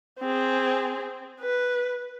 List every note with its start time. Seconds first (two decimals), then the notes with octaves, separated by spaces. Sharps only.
0.20 C4 G#4
1.41 B4